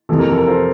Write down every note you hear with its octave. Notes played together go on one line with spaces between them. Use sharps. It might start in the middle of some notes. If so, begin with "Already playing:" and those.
F2 C3 E3 A4
A#4
A4
A#4
A4 C5